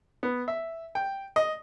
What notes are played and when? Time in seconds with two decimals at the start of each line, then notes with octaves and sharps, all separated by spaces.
0.23 B3
0.48 E5
0.95 G5
1.36 D#5